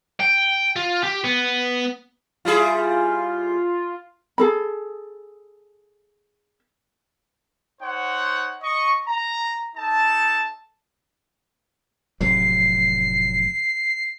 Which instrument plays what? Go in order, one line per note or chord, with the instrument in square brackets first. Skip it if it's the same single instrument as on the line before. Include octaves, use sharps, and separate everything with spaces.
[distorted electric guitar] G5
F4
G4
B3
[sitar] G3 E4 G#4 [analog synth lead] F4
[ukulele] G#4 A4 B5
[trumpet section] D#4 C5 C#5 F#5
D#5 C#6
A#5
D#4 A4 A5
[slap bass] F1 A2 F#3 [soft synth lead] C7